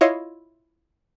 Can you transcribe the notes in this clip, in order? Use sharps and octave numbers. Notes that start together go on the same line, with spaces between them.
E4 F4 C#5 D#5 F5